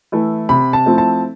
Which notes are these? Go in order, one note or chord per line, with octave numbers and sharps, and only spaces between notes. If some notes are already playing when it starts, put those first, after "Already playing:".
E3 A3 E4
C3 B5
A5
F3 A3 C4 E4
A5